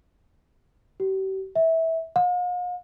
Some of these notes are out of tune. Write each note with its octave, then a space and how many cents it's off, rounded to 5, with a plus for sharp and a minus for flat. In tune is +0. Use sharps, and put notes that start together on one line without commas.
G4 -40
E5 -20
F5 +45